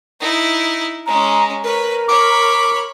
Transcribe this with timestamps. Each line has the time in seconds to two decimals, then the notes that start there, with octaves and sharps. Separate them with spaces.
0.20 D#4 E4
1.06 G#3 C#4 A#5
1.64 A#4 B4 C#5
2.08 C#5 B5 D6